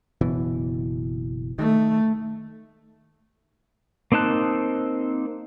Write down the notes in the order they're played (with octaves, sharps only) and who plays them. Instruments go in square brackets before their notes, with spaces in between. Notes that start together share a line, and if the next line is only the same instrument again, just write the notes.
[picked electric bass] F#1 B2 E3
[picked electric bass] D#3 [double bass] A3
[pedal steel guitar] A#3 C4 D#4 A5 F#6